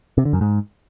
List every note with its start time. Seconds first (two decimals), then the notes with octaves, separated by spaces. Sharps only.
0.18 C3
0.25 D3
0.33 F#2
0.41 G#2